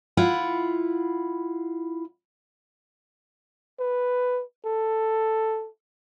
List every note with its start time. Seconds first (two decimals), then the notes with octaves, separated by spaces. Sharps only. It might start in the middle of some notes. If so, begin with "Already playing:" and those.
0.17 E4 F4 F#5
3.79 B4
4.65 A4